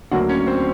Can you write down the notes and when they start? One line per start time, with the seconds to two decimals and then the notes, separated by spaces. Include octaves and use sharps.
0.11 D2 D3 F#3 A#3 F#4 F#5
0.29 C#4 C#5
0.47 C4 C5